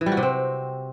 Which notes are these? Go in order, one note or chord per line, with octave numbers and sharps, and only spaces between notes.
E3
G3
F#4
C3
C4